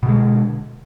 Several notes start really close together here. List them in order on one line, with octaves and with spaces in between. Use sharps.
B2 D3 G#3